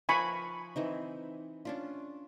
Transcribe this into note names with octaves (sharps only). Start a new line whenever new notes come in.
F3 A#4 F5 G#5 B5 C#6
E3 C4 D#4
C#4 D4 F4